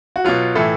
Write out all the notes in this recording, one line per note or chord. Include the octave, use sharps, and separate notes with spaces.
F#4
B2 F#3 F4
A2 E3 A4